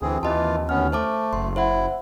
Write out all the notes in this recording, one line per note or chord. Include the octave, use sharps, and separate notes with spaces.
D2 E3 C4 G#4
D#2 E3 C4 F4 D#5 A5
D2 B3 C#4 F6
A3 C5 A5 D6
F#1 C6
E4 C5 E5 F#5